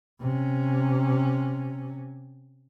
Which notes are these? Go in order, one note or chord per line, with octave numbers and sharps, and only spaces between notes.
C3 C#4